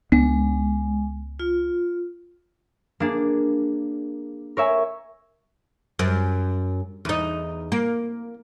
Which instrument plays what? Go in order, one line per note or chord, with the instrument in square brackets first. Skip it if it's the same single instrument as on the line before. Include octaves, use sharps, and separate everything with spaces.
[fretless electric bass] C#2 B3 D4 [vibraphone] G#3
[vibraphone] F4
[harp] A#3 D4 G#4
A#4 C#5 E5 G#5
[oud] F#2
E2 D#4
A#3